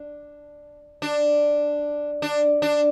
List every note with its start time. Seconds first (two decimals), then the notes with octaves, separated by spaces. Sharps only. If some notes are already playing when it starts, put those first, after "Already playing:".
Already playing: D4
1.02 D4
2.22 D4
2.62 D4